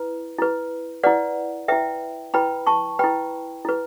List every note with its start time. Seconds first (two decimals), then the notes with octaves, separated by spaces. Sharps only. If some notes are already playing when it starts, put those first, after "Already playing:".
Already playing: E4 B4
0.38 E4 B4
1.03 E4 B4 D5 F#5
1.68 E4 B4 E5 G5
2.34 E4 B4 G5 B5
2.67 A5 C#6
2.99 E4 B4 G5 B5
3.65 E4 B4